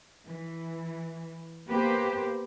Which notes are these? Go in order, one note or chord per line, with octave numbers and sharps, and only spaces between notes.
E3
A#3 B3 G4 B4 C5